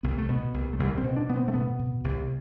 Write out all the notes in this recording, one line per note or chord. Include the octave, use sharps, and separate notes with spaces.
C2 B3
A3
B2 B3
C2
A3
C2 G3
C4
B2
D4
B2 B3
C4
A3
B2 B3
B2
C2